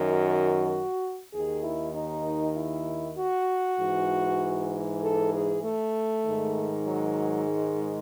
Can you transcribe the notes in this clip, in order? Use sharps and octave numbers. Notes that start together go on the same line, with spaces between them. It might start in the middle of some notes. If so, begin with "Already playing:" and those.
Already playing: F#2 D#3
F#4
D#2 D#3 G#4
E4
D#4
E4
F#4
G#2 E3
A4
G#4
A3
G#2 D#3
F#3
G#3